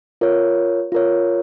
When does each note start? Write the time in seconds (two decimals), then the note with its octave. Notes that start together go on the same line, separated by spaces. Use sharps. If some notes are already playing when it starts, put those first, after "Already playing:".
0.21 F4 A#4 C#5
0.92 F4 A#4 C#5